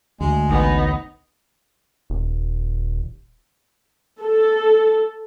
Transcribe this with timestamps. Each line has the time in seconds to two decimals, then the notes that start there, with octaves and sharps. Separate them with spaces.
0.21 D2 G#3
0.49 A1 B3 D#4
2.10 D#1
4.20 A4